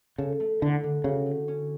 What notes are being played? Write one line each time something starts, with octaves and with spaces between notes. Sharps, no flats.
C#3 A4
A3
D3 E4
D3
C#3 F#4
A3
C#4